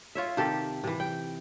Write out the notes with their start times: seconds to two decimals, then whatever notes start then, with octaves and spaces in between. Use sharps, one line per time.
0.15 F4 C#5 E5
0.37 C3 D#3 G4 A4
0.84 C3 E3
1.00 G5